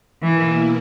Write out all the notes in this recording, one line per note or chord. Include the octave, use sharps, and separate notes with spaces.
B2 E3 A#3 E4